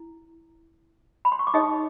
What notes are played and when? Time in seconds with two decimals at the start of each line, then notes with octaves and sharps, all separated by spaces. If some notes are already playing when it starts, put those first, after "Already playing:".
Already playing: E4
1.25 B5
1.32 C6
1.39 C#6
1.47 D6
1.54 D#4 G#4 C#5 D#5 D#6